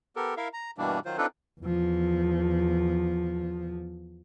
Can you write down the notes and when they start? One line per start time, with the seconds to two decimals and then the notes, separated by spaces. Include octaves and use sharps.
0.16 B3 G4 A4 A#4
0.37 E4 A#4 E5 F5
0.53 A#5
0.78 G2 B2 E3 G3 A#3 D4
1.05 D#3 F#3 F4 C5
1.18 C4 D4 D#4 F4 A4 B4
1.60 E2 F3